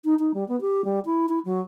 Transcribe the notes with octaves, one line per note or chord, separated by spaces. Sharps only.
D#4
D#4
G3
B3
G4
G3
E4
E4
F#3